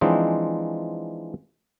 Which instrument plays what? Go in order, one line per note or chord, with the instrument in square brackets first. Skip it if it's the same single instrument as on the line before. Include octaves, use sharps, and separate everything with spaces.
[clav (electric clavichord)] E3 F3 G#3 C4 D4 D#4